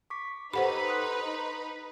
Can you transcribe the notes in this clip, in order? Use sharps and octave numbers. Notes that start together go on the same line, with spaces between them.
C#6 D6 B6
D#4 G4 A4 B4 C5 F#5 B5
C6 D#6 F#6